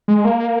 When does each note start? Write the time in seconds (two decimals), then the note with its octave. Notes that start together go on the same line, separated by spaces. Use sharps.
0.08 G#3
0.25 A#3